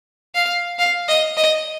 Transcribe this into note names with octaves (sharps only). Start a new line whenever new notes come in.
F5
F5
D#5
D#5